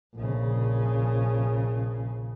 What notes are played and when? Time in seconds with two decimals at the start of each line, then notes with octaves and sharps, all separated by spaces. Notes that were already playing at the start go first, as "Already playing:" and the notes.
0.15 A#1 C#3